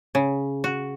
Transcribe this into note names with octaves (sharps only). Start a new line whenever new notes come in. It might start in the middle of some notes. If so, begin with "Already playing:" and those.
C#3
F#4